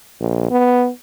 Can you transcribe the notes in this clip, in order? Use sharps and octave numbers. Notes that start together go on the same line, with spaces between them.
A#1
B3